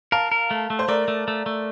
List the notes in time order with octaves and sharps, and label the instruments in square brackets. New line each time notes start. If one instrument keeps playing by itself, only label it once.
[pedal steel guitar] A#4 [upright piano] F5 A5
[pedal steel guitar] A#4
A3
A3
[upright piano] C5
[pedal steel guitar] A3 [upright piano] A#4 D5
[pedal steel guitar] A3
A3
A3